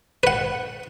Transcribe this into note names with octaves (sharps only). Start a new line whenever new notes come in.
B4 F#5